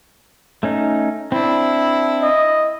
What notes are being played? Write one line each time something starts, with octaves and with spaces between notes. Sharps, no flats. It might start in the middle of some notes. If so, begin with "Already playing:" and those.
A3 C#4 D#4
C4 D4 E4
D#5